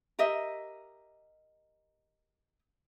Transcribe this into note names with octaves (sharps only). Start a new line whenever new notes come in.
G4 A#4 D#5 E5